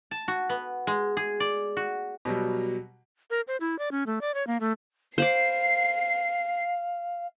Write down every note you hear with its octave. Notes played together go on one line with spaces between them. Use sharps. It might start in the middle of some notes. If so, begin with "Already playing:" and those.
A5
F#4
B3
G#3
G#4
D5
F#4
B2 F#3 G3
A#4
C5
E4
D5
C#4
A3
D5
C#5
A#3
A3
C5 F5 B5 D6 C7